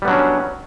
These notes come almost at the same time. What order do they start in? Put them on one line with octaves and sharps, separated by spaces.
G3 B3 F#3 D4 C#4